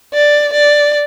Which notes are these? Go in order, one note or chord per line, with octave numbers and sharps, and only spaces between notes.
D5
D5